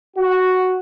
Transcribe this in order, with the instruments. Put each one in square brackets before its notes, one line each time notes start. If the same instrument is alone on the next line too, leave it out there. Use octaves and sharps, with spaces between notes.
[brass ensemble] F#4